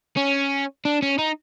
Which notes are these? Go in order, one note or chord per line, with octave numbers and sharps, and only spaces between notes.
C#4
D4
C#4
D#4